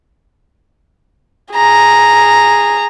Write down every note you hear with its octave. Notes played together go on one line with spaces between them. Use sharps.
G#4 A#5